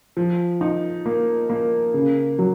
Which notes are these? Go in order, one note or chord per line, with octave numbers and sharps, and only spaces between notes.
F3
D#4
A#3
A#3
C#3
F#3